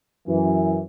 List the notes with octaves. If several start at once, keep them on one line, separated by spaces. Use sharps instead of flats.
F#2 E3